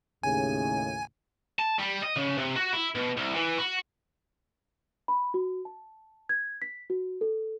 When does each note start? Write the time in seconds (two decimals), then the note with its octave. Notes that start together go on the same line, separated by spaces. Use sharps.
0.23 D#2 A2 C#3 G#5
1.59 A5
1.79 G3
2.03 D#5
2.17 C#3
2.37 C3
2.56 F#4
2.73 E4
2.95 B2
3.17 C2
3.34 E3
3.58 F#4
5.08 B5
5.34 F#4
5.65 A5
6.29 G#6
6.62 B6
6.90 F#4
7.21 A4